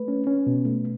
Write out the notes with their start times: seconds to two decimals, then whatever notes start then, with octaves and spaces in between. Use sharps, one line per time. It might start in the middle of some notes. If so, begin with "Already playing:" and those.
Already playing: A3 B4
0.08 C#4
0.27 C#4
0.47 B2
0.66 A3